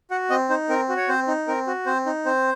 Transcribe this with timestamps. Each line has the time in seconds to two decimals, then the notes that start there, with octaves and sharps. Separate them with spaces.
0.11 F#4 F#5
0.30 C4 D#5
0.50 D#4 C5
0.69 C4 A#4
0.89 F#4
0.97 C#5
1.08 C4 C5
1.28 D#4
1.48 C4 A#4
1.67 F#4
1.86 C4 C5
2.06 D#4
2.26 C4 C5